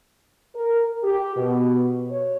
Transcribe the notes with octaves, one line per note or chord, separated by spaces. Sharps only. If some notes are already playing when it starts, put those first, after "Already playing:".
A#4
G4
B2
C#5